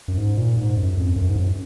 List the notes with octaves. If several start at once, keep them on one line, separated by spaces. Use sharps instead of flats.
F#2
G#2
A#2
G#2
F#2
F2
F#2
G#2
F#2